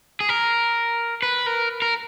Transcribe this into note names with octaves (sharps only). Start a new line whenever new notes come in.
G#4
A#4
B4
A#4
A#4